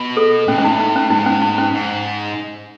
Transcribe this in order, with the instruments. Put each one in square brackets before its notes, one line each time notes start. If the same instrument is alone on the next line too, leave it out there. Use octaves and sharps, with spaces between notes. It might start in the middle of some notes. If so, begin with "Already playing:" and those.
Already playing: [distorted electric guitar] B2
[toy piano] A4
[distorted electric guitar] A2 [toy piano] C#4
[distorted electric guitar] G#2 [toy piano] C#4
[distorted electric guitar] A2 [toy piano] D#4
[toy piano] D#4
C#4
[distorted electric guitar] G#2 [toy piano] D#4
[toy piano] C#4
D#4
C#4
[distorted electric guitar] G#2